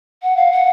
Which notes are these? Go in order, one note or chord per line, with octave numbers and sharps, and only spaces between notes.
F#5
F5
F#5